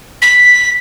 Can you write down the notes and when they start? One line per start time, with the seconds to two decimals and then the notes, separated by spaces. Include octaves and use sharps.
0.22 B6